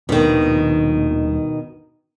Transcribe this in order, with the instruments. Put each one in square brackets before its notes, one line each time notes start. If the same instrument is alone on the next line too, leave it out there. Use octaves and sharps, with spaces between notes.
[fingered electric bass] D#1 A#3 D4 [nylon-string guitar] B2 D#3